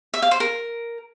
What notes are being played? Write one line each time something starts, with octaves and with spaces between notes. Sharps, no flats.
E5
F5
C5
A#4